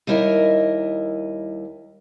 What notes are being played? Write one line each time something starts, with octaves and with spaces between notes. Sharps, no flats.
D#2 G3 E4 A#4 D#5 E5